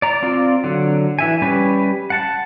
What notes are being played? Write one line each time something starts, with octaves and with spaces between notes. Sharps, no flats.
D5 A#5
C4 F4 D5
D3 F#3
E3 E5 G#5
G3 C#4 G4 B4 G#5
F#5 A5